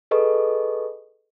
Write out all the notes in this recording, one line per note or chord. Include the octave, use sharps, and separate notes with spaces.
G#4 A4 B4 D#5 C#6